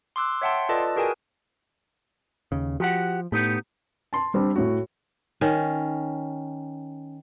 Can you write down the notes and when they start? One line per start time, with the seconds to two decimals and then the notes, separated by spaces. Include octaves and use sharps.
0.16 C6 D6 E6 F#6
0.42 C#5 E5 F#5 G5 A5 C6
0.69 F4 A4 B4 D5 D#5 A5
0.96 F#4 G#4 A#4 B4 G5 G#5
2.52 D#2 C#3
2.80 F3 F#4 G4 F#5
3.32 A2 B3 D#4 G4
4.13 A5 C6
4.34 G3 C4 D4
4.55 A2 F#4
5.41 D#3 C#4